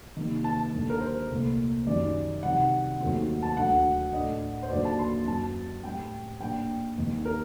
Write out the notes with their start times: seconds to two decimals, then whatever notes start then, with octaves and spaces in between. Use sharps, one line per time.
0.16 C3 D#3 G3 A#3
0.44 A5
0.73 D#2 D3 G3
0.90 A#4
1.01 C5
1.29 C2 A#2 A3
1.86 F#2 D#3 G3 D5
2.43 C3 D#3 G3 F#5
3.00 D#2 D#3 F#3 A3 C4
3.42 A5
3.57 D2 D3 F#3 F#5
4.13 A2 A3 D4 D#5
4.63 C5
4.70 D#2 D3 F#3 A#3 D5
4.85 A5
4.99 C6
5.27 F#2 F#3 C4 A5
5.84 A2 G3 C4 G5
6.41 A#2 G3 D4 G5
6.97 D#2 D#3 G3 C4
7.25 A#4